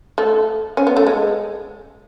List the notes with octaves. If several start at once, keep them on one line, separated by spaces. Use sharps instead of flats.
A3
C#4
B3
A3
G#3